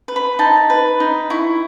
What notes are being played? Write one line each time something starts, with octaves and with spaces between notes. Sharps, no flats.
B4
B5
D#4 A5
B4
D#4
E4 C#6